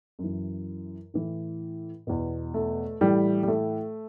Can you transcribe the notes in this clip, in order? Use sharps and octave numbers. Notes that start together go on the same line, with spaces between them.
F#2
E3
A2 E3
E2 B2
A3
A2 E3 G3
G3
A3